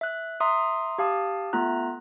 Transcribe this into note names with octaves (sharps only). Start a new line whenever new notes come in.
E5 F#6
E5 A#5 C6 D#6
G4 F5 A5 D#6
A3 B3 F4 A#5 F#6